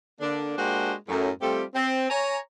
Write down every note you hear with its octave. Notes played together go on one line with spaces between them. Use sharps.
D3 A#3 D4
G#3 A#3 D4 F#4 G4 C5
F#2 A2
G3 A3 C4 F4 G4 A4
C4
C#5 G#5 A#5